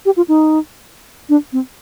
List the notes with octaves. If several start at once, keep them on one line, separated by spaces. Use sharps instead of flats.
G4
F4
D#4
D4
C4